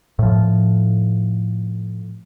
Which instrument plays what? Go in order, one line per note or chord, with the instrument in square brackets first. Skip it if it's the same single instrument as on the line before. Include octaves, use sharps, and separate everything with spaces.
[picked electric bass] A2 F3